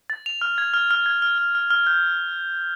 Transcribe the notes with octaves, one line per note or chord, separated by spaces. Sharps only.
A6
F7
F6
G#6
F6
F6
G#6
F6
F6
F6
F6
G6